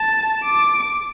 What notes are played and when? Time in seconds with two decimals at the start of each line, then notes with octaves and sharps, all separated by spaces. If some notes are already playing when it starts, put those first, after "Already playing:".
Already playing: A5
0.44 D6